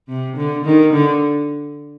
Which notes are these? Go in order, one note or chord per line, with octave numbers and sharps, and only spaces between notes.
C3
D3
D#3
D3